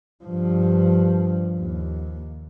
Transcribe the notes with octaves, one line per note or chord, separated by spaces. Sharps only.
G2 F3
D#2